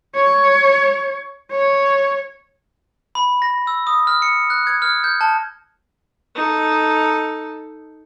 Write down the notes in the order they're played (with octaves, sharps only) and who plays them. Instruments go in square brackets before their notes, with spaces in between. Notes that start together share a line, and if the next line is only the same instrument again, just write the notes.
[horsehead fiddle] C#5
C#5
[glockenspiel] B5
A#6
E6
D#6
F6
C#7
F#6
G#6
F6
G6
A5
[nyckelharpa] D#4 A4